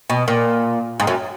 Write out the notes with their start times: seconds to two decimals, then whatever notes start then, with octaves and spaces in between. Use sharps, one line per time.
0.10 B2
0.28 A#2
1.00 G#2
1.07 F#2